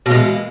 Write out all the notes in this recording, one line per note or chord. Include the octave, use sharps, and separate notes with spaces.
B2 E3 G#3 A#3